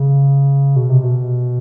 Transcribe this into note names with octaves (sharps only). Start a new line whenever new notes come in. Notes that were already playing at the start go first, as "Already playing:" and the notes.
Already playing: C#3
B2
C3
B2